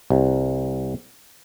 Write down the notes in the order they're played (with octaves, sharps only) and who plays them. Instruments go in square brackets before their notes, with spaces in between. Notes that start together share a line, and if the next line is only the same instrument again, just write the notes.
[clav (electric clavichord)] C2